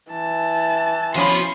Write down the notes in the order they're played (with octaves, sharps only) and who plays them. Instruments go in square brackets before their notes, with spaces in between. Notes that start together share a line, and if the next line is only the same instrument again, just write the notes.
[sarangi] E3 [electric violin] A5
[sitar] F3 C#4 [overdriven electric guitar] F#4 B5 [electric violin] C6